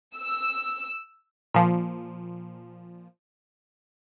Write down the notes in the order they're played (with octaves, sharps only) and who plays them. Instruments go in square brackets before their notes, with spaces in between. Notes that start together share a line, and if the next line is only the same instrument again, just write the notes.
[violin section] E6
[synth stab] A#2 F3